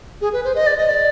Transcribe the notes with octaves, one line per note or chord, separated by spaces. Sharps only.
G#4
B4
C5
D#5
D5
D#5
D5